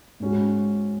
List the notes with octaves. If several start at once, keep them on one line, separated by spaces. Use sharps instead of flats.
G#2 G#3 C#4 F#4